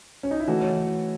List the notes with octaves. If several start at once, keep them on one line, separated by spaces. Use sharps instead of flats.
C#4
D#4
E4
C#3 E3 A3 F#4
C#5